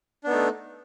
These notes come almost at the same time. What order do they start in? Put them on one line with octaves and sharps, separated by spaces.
D4 B3 D#4 A3